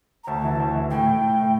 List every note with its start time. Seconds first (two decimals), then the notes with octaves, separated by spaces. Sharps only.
0.24 A#5
0.27 D2 A5
0.44 E3
0.60 D2
0.74 E3
0.91 A2 G5
1.07 A2
1.22 A2
1.38 A2